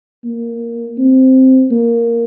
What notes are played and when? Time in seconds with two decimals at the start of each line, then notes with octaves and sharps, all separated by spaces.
0.24 A#3
0.98 C4
1.71 A#3